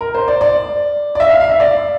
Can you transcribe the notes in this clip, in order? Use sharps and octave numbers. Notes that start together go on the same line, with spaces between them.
A#4
C5
D5
D5
D5
E5
F5
F5
E5
D5